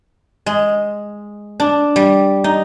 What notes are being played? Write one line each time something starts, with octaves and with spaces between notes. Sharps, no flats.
G#3
D4
G3
D#4